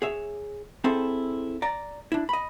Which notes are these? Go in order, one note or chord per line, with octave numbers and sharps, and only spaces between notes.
G#4 C#5 E5
C4 E4 G#4 A4 C5
D5 A#5
D4 E4
D#5 B5